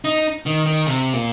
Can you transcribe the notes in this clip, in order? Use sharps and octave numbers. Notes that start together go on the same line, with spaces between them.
D#4
D#3
D#3
C3
A#2